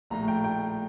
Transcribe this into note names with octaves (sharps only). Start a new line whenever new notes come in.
A#1 A2 A3 A#5
G5
G5